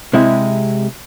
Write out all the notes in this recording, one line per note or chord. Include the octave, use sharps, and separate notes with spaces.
C3 G#3 E4